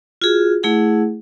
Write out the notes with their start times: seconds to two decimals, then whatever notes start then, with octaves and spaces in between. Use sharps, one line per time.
0.22 F4 F#4 G#4
0.63 A3 E4 G#4 F#5